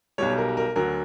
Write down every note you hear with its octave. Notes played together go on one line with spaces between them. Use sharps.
B1 B2 G3 C#5
A#4
A#4
D2 D3 F#3 A#4